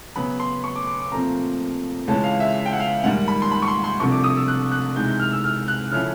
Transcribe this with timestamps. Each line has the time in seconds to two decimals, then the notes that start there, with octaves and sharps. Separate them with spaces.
0.16 C#3 F#3 B3 B5
0.40 C6
0.64 C#6
0.76 D6
0.87 D6
1.00 D6
1.12 A#2 F3 A3 C4 A#5
2.08 C#2 C#3 E3 G#3 C#4 A5
2.24 F5
2.40 E5
2.66 G5
2.73 F#5
2.80 F5
3.04 G#2 D#3 G3 A#3 F#5
3.28 B5
3.42 C6
3.52 B5
3.62 C#6
3.68 C6
3.84 C6
4.00 C2 C3 F3 A3 D4 C#6
4.12 D6
4.24 D#6
4.36 E6
4.48 F#6
4.72 F#6
4.96 C3 E3 G#3 C4 D#4 G6
5.08 G6
5.20 F6
5.32 E6
5.44 F6
5.68 F#6
5.92 C#3 F3 A3 C#4 E4 F6